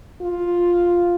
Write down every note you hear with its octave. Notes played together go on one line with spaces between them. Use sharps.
F4